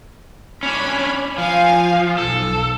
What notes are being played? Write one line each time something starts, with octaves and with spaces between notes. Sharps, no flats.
C#4 D4 B5
F3 F5 G#5
B1 A4